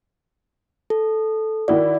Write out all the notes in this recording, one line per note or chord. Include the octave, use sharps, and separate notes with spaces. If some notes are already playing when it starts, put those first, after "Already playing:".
A4
D#3 E4 F#4 D5